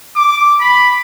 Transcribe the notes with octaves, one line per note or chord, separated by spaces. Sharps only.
D6
B5